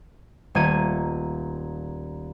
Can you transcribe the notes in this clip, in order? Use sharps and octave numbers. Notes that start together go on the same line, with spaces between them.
D#1 A3 A#3 G#6 D#7